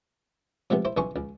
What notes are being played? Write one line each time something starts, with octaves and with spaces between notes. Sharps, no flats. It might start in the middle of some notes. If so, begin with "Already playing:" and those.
C3 F3 G#3 A3 B3
E4 C5
B1 C#3 E3 C#4 C6 C#6
C#2